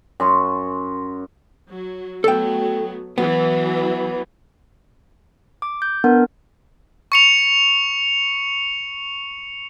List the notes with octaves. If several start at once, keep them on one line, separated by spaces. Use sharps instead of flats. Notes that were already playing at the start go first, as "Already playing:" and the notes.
F#2 C6 C#6
F#3
F#3 A3 B3 A4 G5
E3 F#3 B3
D6
G6
B3 D4 A#4
C#6 C#7 F7